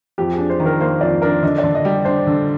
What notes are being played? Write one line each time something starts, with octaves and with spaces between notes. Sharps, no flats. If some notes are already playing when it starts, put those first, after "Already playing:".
F2 G4
G#4
D4
C5
D#3
A#4
A#3 C5
F2 D5
D4 A#4
D3 D#5
D5
D3
D#5
G3
D4 C5
D3